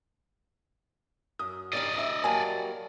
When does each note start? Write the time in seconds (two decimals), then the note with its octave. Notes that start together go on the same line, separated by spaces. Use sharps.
1.39 F#2 D#6
1.73 G3 C#4 D#4 D5 D#5
1.94 D2 E5
2.24 F#3 G3 A#3 G#5 A5